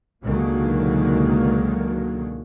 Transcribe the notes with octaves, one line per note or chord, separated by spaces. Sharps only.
C#2 B2 D3 D#3 F#3 A#3